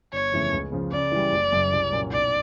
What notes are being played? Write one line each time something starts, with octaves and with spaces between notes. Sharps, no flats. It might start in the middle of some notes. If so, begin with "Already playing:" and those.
G1 C#5
F2 C#3 E3 A3
C#2
C#3 F3
C#3 D5
E3 G3
F#1
F#2 C#3 F#3
C2
A#2 F#3 A#3 C#4
B1 D5